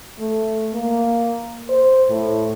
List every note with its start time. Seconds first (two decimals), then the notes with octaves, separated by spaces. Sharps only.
0.19 A3
0.74 A#3
1.69 C5
2.09 A2